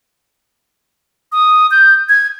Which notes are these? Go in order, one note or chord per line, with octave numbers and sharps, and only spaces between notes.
D#6
G6
G#6